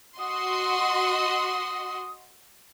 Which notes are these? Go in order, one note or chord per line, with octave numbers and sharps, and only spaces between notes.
F#4 D#5 C6 D#6